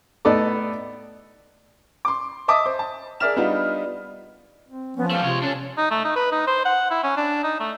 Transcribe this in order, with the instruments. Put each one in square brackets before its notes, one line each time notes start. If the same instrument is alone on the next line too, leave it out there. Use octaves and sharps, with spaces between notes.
[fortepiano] A2 B3 D#4 A4 D5 D6
[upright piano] C6 D6
D#5 E5 A5 D6 D#6
C5
A5
G#4 A#4 D5 E5 F6 E7
G3 B3 D4 D#4 F4
[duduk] C4
[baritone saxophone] F3 [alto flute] B3 [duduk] C#4
[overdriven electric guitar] G3 A3 [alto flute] F5
[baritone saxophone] C3 [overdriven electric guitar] G#3 C#5 [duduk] F4
[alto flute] C#4 [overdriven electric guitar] D4 A4
[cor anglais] D#4
A3
D#4
B4
D#4
C5
F#5
E4
C#4
D4
D#4
A3